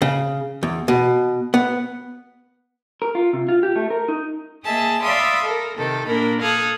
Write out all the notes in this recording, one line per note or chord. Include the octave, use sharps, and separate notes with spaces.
C#3
E2
B2
B3
A#4
F4
C3
F4
G4
A3
A#4
D#4
A#3 G#4 D#5 E5 A5
D5 E5 F5 B5 C6 D#6
A4 A#4
C3 D#3 A4
A#2 A#3 D4 A#4 B5
A4 F5 D#6 F#6 G#6